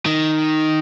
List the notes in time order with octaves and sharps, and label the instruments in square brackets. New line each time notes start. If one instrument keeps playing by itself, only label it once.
[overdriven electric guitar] D#3